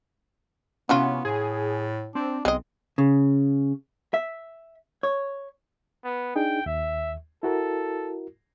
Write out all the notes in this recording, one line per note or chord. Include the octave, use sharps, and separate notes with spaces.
C3 E3 F#3 B3 C#4 F4
A2 G#4
C4 D4
B1 G#3 C4 D#5
C#3
E5
C#5
B3
D4 D#4 G#4 G5
D#2 E5
E4 F#4 A4 A#4